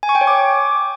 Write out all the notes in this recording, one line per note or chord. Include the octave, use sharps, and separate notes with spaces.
G#5
C#6
G5
C#5
D6